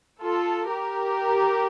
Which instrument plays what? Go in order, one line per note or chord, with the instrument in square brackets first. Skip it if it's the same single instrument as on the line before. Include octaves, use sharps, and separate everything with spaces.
[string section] F4 A4
G4 A#4